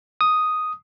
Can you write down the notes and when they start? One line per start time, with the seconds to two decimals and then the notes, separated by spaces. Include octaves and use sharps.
0.21 D#6